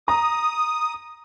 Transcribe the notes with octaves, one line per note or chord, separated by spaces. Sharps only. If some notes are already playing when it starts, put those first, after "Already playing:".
A#5 D#6